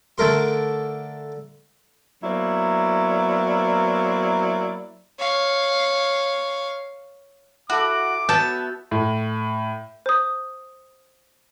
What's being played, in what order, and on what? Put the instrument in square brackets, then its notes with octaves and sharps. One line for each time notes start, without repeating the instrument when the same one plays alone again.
[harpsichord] D3 A3 A#4 C6
[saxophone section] F#3 A#3 B3 E4 C5 D5
[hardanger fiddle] C#5 F5
[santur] E4 A4 [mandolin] F#4 [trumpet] D6
[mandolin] B3 E5 G6 [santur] F#4 [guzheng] A5
[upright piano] A2
[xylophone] C5 D#6